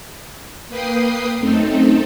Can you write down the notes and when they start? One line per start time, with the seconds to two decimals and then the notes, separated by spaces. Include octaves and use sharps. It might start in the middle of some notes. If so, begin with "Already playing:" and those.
0.69 A#3 B4 G5 D#6 C7
1.39 F#2 A3 C4 D#4 A4